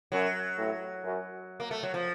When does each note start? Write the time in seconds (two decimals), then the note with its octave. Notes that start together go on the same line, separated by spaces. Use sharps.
0.12 F#2 F#3
0.57 A1 A2
1.03 F#2
1.60 A#3
1.71 A3
1.83 F#3
1.94 F3